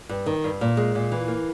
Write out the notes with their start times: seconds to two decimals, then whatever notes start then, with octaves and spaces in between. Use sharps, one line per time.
0.09 G2
0.26 D#3
0.44 G2
0.61 A#2
0.77 G#3
0.95 A#2
1.12 E3
1.28 A#3